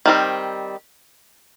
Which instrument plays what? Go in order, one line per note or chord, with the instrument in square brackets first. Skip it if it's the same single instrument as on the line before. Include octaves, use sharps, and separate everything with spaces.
[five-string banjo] D#3 G3 C4